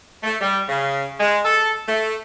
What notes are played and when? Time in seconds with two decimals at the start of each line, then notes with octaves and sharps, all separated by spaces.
0.24 A3
0.41 G3
0.69 C#3
1.20 G#3
1.45 A4
1.88 A3